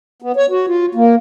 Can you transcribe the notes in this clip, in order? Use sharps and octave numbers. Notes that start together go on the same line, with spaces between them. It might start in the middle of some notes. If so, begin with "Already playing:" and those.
B3
C#5
F#4
F4
A#3